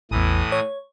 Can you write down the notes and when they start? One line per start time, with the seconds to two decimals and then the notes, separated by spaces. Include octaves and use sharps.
0.11 A1 E2 A2 E3 D#6
0.52 C#5